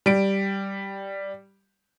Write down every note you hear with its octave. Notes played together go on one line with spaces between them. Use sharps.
G3 D7